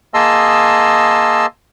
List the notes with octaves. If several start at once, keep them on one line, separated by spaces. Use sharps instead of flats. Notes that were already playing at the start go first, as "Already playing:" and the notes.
A#3 G#4 D#5 A5 C6 E6